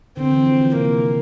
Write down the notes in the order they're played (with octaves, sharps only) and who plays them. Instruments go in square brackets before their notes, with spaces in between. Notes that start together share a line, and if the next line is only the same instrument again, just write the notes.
[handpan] D3 [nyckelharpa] C4
[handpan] E3
F3
E3
[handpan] C3 [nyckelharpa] A#3